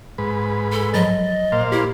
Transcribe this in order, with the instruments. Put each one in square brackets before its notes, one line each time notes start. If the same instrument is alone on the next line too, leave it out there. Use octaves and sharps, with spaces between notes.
[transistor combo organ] G#2 B4
[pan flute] A4
[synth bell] F3 F#3 A6 [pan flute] D#5
[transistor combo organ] A#2 C5 F5
[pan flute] E4 [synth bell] G4